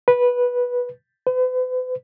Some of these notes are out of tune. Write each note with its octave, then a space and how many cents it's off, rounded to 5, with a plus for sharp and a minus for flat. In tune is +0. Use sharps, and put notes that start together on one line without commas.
B4 -10
B4 +45